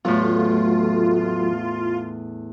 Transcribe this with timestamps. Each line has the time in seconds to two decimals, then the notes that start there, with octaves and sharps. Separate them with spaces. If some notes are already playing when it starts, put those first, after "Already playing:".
0.05 E2 A2 F#3 A3 F4